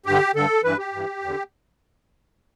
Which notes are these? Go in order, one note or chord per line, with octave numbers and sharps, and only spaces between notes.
G2 D3 G4
G2 D3 A4
G2 E3 B4
G4
G2 E3
E2 D3